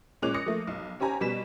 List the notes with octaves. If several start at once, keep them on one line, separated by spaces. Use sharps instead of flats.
A#2 G#3 C#4 D6 F#6 F7
D#6 A#6 C#7
F3 A3 A#3
B1
C#4 G4 C5 G#5 A#5
B2 G3 B4 B6 E7